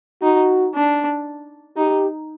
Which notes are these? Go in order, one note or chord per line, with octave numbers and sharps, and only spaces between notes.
D#4 F#4
D4
D#4 G4